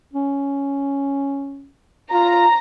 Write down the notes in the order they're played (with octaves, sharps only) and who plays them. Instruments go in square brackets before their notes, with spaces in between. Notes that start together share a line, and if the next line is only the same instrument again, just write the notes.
[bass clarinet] C#4
[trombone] F4 [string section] A#5